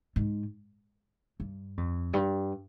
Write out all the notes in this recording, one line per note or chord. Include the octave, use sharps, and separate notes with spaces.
G#2
G2
F2
G2